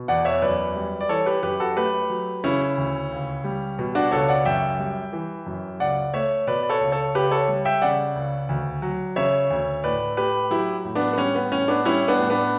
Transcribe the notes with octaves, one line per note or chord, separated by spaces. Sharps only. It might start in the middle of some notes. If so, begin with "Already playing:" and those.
Already playing: B2
E2 D5 F#5
C#5 E5
F#2 B4 D5
G3
D5
E3 A4 C#5
G4 B4
F#2 G4 B4
F#4 A4
A3 G4 B4
F#3
C#3 C#4 E4
D2
C#2
G3
B2
D4 F#4
C#2 A4 C#5
D5 F#5
F#2 E5 G5
G3
E3
F#2
C#2 D5 F#5
A3 C#5 E5
B2 B4 D5
D5
A4 C#5
C#2
A4 C#5
C#2 G4 B4
A4 C#5
G3
E5 G5
C#3 D5 F#5
C#2
D2
F#3
C#3 C#5 E5
D2
A2 B4 D5
A3 G4 B4
F#3 E4 G4
A2
B3 D4
B3
G3 C#4
B3
A2 C#4
B3 D4
G3 C#4 E4
B3 D4
A2
B3 D4